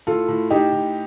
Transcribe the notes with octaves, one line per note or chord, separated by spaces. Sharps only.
A2 F4 A4
A2
A2 D#4 G4
A2